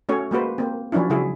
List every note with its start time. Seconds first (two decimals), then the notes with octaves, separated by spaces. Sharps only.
0.09 A3 C#4 F#4 C#5
0.31 G#3 A#3 F#4 B4 C5
0.58 A#3 C4
0.92 F3 F#3 C#4 D4 E4
1.10 C#3 F#3 G#3 E4 G#4